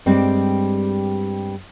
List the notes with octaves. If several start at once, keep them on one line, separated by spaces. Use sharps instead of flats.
G2 G3 G#3 C4